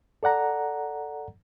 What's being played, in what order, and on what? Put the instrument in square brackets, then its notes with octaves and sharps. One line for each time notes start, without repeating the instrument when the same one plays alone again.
[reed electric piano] A4 D5 F#5 A#5